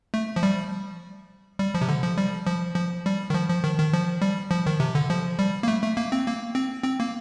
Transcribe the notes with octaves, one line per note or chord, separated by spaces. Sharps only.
A3
F3
G3
G3
F3
C3
D3
F3
G3
F3
F3
G3
D#3
F3
F3
D#3
D#3
F3
G3
F3
D#3
C3
D3
F3
G3
A#3
A3
A3
A#3
C4
A#3
C4
C4
A#3